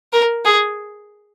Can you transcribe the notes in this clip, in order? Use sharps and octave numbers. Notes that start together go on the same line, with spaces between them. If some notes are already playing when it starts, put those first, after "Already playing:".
A#4
G#4